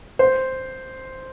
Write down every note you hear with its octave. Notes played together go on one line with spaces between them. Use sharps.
C5